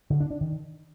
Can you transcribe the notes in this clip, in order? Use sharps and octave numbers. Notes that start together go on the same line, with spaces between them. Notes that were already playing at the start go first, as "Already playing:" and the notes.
D3
D4
D4
D#3